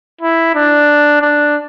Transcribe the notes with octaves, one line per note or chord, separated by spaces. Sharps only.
E4
D4
D4